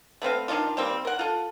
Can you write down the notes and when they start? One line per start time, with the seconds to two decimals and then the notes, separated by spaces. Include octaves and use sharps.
0.22 A3 B3 C4 F5
0.48 D#3 D4 D#4 F4
0.77 D#3 G3 A#3 C4
1.05 A#4 F#5
1.19 F4 A4